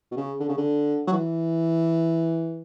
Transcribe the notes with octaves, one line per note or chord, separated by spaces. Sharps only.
B2
C#3
D3
C#3
D3
F#3
E3